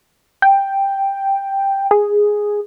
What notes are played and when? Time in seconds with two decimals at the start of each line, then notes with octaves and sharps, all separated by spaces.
0.42 G5
1.91 G#4